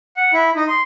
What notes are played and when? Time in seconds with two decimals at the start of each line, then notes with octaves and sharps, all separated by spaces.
0.17 F#5
0.33 E4
0.56 D#4
0.68 C6